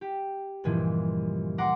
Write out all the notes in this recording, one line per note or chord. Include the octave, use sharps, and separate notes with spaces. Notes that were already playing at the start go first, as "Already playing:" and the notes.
G4
C#2 G2 A#2 E3 F3
F#5 A#5 C6 D6